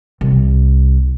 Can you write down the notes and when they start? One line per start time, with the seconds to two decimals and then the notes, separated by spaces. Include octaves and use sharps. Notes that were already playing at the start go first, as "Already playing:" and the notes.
0.21 C2